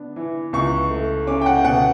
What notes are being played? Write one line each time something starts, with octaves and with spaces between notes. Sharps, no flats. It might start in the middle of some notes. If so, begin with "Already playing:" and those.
Already playing: B3 D4
E3
C#2 C#6
A3
C#4 D6
G5
F#5
B2 F#5